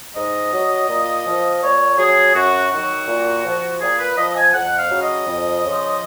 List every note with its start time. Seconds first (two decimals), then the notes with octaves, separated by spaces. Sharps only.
0.16 G#2 D#5
0.53 F#3
0.89 A#2
1.26 F3
1.62 A#2 C#5
1.99 F#3 G#4
2.35 F#2 F#4
2.72 D#3 F#3 F#4
3.08 A#2
3.45 F3
3.81 A#2 G#4
3.99 B4
4.17 F3 D#5
4.36 G#5
4.54 F2 F#5
4.78 F5
4.90 C#3 F#3
5.02 D#5
5.27 F2
5.63 C#3 F3